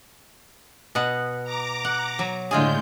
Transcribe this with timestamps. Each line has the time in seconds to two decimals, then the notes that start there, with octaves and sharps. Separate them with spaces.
0.95 B2 B3 F#5
1.44 A#5 D6
1.85 F#5
2.19 F#3
2.51 A2 D3 G#3 F4 G#4 G6